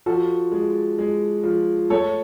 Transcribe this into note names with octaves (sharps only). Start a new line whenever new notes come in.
F3 F#4 A4
G#3
G#3
F3
A3 A4 C#5